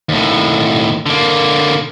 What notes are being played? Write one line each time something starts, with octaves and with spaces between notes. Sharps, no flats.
D#2 A2
D3 A#3